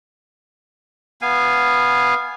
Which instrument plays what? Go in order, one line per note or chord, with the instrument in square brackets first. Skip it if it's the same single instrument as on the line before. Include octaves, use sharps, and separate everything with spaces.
[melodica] B3 F5 G#5